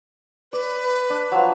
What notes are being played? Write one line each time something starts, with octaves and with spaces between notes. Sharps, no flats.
B4 D5
D4
F3 F#3